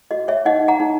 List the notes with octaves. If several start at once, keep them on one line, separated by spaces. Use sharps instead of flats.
F#4 D#5
C#5 E5
D#4 D#5 F#5
F#5 A#5
D#4